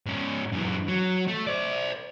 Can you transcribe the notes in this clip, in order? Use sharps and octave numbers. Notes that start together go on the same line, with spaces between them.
G#2 C#4
F#2 E3
F#3
A3
C5 D5